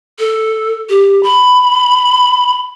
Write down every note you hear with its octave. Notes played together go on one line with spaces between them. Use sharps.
A4
G4
B5